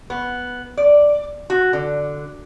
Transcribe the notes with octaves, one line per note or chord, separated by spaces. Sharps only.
B3
D5
F#4
D3